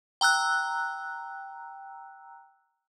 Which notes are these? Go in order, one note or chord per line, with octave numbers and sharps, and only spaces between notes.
G5 A#5 E6 F#6